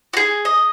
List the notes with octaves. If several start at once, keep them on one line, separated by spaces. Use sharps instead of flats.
F#4
G#4
D#5